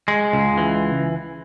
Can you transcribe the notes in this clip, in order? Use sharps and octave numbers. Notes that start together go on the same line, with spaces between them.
G#3
C#2
E3